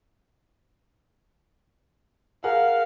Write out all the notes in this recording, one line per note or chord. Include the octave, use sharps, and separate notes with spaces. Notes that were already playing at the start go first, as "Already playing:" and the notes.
G#4 A#4 F5 F#5